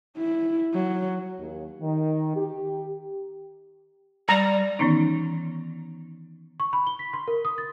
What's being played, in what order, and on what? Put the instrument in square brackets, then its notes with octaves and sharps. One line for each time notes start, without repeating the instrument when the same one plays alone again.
[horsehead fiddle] E4
F#3
[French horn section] D#2
D#3
G4
[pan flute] G3 [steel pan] A#5
[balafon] D#3 E3 B3 C#4 D#4
[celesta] C#6
B5
G7
B6
C6
A#4
D#6
A6